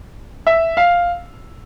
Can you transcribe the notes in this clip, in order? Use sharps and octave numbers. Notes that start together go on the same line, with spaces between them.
E5
F5